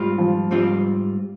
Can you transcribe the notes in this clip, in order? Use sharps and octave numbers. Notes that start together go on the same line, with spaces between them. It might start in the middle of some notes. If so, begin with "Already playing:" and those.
Already playing: G#2 G3 C4 F4
F3
G#2 G3 C4 F4